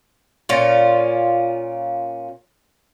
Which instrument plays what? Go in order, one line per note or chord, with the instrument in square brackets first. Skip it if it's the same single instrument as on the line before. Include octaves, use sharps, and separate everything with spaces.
[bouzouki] A#2 C#4 F4